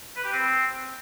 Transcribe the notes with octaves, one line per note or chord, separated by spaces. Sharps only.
B4
G4
C4